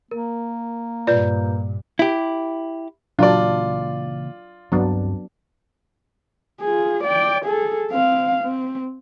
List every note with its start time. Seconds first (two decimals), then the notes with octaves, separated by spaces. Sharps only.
0.11 A#3 A#4
1.07 G2 A#2 F4 B4 D5 G6
1.99 E4 G4
3.19 A#2 C#3 E3 F#3 D4 F4 D5
4.72 D2 G2 F#3 B3 C4 D4
6.62 F4 G#4
7.04 D5 G5
7.45 G#4 A4
7.91 C4 F5
8.43 C4